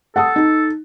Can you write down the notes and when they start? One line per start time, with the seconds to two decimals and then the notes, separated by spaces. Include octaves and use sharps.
0.16 A4 F#5 A5 D#6
0.36 D#4